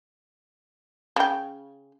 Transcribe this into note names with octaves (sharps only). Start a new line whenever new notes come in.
C#3 G5